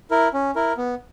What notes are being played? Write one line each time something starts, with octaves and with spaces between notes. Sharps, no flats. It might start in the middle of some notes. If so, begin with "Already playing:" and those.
E4 A#4
C#4
E4 A#4
B3